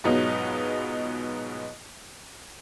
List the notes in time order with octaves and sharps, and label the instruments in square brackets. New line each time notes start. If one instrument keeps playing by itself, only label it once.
[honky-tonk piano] G#2 B2 F#3 B3 D#4 F4